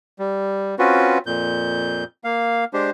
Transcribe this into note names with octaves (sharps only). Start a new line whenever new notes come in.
G3
C4 C#4 F4 F#4 B4
F2 A#2 G6
A#3 F5
G#3 D4 G4 C5